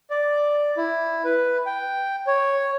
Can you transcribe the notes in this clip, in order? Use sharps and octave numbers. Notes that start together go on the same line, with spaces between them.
D5
E4
B4
G5
C#5